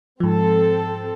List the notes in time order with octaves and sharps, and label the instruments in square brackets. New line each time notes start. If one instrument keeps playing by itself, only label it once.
[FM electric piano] G#2 F3 [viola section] C4 A4